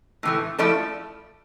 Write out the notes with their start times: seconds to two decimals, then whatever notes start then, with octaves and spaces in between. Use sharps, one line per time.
0.23 A2 E3 A3
0.59 F3 A3 E4 A4 D5